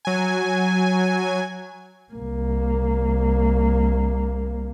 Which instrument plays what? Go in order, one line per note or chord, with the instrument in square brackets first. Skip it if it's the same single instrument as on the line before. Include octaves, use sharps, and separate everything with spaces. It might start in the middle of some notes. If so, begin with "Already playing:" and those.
[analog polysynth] F#3 G#5
[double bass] C2 A#3